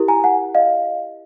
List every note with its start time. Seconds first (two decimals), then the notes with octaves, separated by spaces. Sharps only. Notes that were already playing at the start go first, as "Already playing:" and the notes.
Already playing: E4 G4 A#4
0.08 G#5 A#5
0.24 F#5 G#5
0.55 D#5 F5